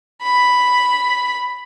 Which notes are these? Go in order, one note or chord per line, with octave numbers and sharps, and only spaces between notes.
B5